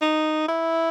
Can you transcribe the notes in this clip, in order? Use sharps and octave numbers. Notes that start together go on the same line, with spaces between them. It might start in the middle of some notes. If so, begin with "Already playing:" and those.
D#4
E4